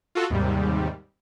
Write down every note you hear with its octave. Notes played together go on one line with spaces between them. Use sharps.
F4 F#4 A4
D#2 G#2 C3 G3